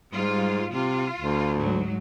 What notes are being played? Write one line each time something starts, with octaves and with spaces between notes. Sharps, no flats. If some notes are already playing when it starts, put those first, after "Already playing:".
G#2 G3 F4
C3 F4
D2
G#2 F#3